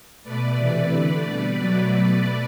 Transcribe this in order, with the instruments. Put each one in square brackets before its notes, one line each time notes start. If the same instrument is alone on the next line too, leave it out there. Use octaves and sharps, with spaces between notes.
[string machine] B2 A3 B4 D5
C3 E3 A3
D3 A3 B4 D5
B2 G3
B2 F#3 A3 B4 D5
B2 A3